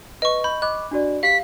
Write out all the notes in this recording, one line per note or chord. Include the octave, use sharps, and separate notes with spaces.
B4 D#5 C#6
B5 G6
D#5 B5 D6 F#6
D4 F#4 D5
G4 F5 B6